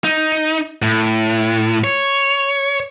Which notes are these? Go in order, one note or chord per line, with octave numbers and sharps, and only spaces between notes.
D#4
A2
C#5